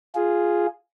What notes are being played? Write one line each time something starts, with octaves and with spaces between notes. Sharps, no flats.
F4 G#4